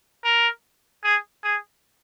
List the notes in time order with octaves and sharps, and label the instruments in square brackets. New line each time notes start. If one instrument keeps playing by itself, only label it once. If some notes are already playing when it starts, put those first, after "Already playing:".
[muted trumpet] A#4
G#4
G#4